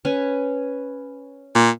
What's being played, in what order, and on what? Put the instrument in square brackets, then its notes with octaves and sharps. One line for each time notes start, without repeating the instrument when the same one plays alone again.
[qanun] C#4 B4 G#5
[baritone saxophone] A#2